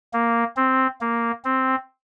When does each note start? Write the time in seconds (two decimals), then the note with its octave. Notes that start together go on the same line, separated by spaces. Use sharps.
0.13 A#3
0.56 C4
1.01 A#3
1.45 C4